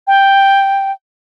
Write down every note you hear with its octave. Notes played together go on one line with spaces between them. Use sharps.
G5